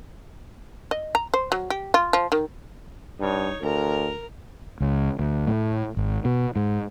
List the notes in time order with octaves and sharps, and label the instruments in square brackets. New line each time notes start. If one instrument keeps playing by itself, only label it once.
[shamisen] D#5
A#5
C5
F#3
G4
F4
F3
D#3
[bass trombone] G2 [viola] D#4 C#5
[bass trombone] D2 [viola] A#4 A#5
[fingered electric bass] C#2
D2
A2
G#1
B2
G#2